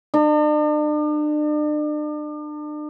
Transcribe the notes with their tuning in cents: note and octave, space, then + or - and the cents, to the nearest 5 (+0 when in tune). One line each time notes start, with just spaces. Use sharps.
D4 +40